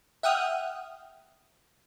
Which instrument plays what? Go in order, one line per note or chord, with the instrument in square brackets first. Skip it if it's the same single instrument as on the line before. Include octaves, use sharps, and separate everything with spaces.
[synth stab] E5 F#5 G5 D#6 F6